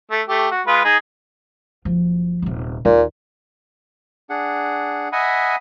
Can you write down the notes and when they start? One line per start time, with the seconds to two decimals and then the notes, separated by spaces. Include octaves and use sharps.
0.11 A3
0.29 A3 G4
0.52 F#4
0.67 G#3 F4 B4
0.85 D#4 G#4
1.85 F#1 F3
2.42 D#1 C3
2.85 D#2 A#2
4.30 D4 G#4 F#5
5.13 D#5 E5 F#5 G#5 B5 D#6